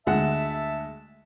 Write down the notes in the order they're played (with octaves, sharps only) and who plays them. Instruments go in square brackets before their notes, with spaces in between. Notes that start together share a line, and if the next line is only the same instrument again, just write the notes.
[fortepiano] D2 G#3 F#5 [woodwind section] E5 A5